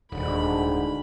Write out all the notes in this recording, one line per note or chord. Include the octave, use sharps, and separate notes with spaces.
D#1 D2 G#2 B5